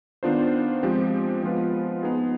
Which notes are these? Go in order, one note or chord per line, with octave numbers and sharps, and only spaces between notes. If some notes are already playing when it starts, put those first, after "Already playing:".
D#3 B3 D4 F4 C5
F3 G#3 C4 G4
F3 G#3 B3 F4 B4
B3 D#4 G#4